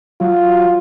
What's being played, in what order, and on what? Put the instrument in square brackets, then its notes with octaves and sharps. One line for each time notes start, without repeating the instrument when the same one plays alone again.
[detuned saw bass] F#3 [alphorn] F4